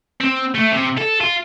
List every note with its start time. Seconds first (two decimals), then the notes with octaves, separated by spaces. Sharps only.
0.21 C4
0.55 A3
0.72 C3
0.98 A4
1.21 F4